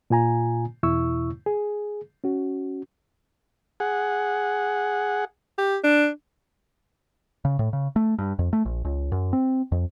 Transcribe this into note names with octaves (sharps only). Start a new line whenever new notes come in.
A#2 F4 G#5 A#5
E2 B2 E4 C#6 E6
G#4
C#4 F#4
G#4 F#5
G4
D4
C#3
A2
C#3
A3
G2
F2
A3
A#1
C#2
F#2
C4
F2